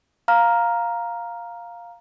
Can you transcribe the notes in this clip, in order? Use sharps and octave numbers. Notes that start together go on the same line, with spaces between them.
F5 A#5 F6